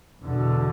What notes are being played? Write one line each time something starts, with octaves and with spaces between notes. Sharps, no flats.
E2 B2 D3